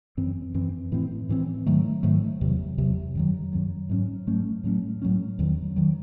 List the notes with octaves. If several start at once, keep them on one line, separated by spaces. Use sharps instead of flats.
F#2 E3 C4
F#2 E3 C4
A2 E3 C4
A2 E3 C4
G#2 D#3 F#3 A3
G#2 D#3 F#3 A3
E2 C3 F#3
E2 C3 F#3
F#2 D#3 F#3
F#2 D#3 F#3
G#2 F#3 A3 C#4
G#2 F#3 A3 C#4
A2 F#3 A3 C#4
A2 F#3 A3 C#4
E2 D#3 F#3
D#3 F#3